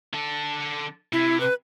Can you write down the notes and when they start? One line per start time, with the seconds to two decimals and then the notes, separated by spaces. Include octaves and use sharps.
0.13 D3 A4
1.13 C3 E4
1.40 B4